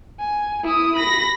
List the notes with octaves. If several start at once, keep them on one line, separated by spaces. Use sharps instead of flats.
G#5
E4 D#6
B5 A#6